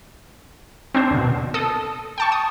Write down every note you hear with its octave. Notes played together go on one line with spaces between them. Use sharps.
C4 D4 C5
D#2 B2
A4 D#6
G5 A5 C#6
D#6